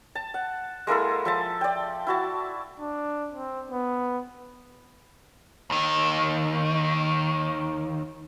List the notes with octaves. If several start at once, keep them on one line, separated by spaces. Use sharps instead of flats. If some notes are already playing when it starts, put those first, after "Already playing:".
A5
F#5
G#3 A#3 E4 A4
F3 E5 A5
D5 G5
E4 F#4 A5
D4
C4
B3
D#2 D#3